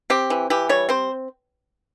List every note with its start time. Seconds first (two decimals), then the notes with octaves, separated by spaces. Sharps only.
0.10 C4 G4
0.30 E3
0.50 E3 G4
0.69 G3 C#5
0.89 C4 C5